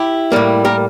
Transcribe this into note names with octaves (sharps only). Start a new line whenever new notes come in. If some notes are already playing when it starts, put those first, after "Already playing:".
Already playing: E4 G4
A2 G3 A#3
G4 A#4